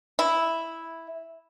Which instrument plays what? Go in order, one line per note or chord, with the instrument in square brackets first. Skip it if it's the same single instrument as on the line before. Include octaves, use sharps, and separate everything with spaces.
[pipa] E4